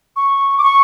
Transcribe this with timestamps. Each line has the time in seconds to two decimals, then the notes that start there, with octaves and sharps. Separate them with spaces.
0.16 C#6
0.58 D6
0.63 C#6